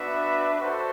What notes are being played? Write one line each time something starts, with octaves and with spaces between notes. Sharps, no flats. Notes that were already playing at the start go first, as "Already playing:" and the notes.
Already playing: B3 D4 F#4 B4 E5
F#4 A4 C5